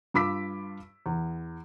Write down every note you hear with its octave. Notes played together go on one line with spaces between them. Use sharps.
G2 F4 B5 D6 E6 B6
E2